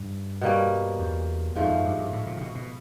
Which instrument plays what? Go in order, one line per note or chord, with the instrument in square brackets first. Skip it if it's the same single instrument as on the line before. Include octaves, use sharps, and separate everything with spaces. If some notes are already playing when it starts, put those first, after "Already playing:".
Already playing: [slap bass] G2
[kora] B2 G3 A#3 C#4
[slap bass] E2
[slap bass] F2 [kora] G#2 F3 A3
[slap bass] F#2
G2
G2
A2
A#2
A#2
B2
B2